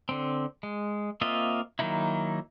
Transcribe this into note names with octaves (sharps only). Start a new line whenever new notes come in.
D3 C4
G#3
A#3 C4 F4 D#5 E5
D#3 F#3 A#3 D#4 E4